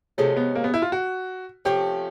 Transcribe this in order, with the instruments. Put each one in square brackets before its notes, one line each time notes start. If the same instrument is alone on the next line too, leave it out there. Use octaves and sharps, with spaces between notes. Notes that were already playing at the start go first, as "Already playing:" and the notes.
[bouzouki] C3 F3 G#3 C#4 [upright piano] A3
[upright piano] B3
A#3
B3
E4
F4
F#4
[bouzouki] C3 F3 A3 C#4 [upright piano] G4